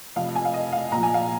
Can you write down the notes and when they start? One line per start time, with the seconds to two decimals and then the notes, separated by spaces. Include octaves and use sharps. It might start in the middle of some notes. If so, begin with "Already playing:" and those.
0.16 F1 F2 F3 F5
0.35 G#5
0.45 F5
0.54 D#5
0.72 F5
0.92 A#1 A#2 F3 A#5
1.03 G#5
1.14 F5